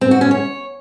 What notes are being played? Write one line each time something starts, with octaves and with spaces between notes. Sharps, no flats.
C4
F#4
C#4
C#5